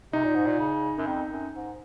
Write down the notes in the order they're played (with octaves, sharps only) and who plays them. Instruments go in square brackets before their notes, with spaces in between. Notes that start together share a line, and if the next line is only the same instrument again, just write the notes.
[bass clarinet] C3 [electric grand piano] D#4
[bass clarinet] A#2
G#2
A#2
C#3
F#2
F2
F#2
G#2